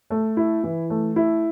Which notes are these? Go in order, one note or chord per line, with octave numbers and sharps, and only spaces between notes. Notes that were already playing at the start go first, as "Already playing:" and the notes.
A3
E4
E3
A3
E4